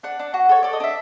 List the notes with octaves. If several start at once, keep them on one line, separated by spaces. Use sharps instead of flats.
D4 F#5
D4
F#4
A4 C#5
A4 D5
D#5
D4 E5